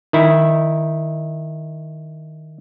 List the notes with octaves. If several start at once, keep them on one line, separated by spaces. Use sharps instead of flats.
D#3 E4